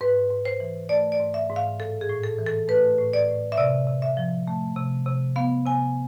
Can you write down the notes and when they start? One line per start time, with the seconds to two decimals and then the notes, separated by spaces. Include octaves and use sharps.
0.01 G#2 B4
0.30 G#2
0.45 C5
0.60 E3
0.89 A3 D5
1.12 D5
1.20 G#2
1.34 E5
1.50 G#2
1.56 F5
1.78 A2 A4
2.01 G#4
2.09 A2
2.23 A4
2.39 E3
2.47 A4
2.68 A3 B4
2.98 A2
3.13 D5
3.28 A2
3.52 E5
3.57 C3 D5
3.87 C3
4.02 E5
4.17 F3
4.47 A3
4.76 C3
5.06 C3
5.36 B3 F5
5.66 C3 G#5